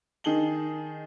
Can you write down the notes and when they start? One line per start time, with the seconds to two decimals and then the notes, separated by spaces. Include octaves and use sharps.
0.24 D#3 D#4 G#4 A5 F#7 G7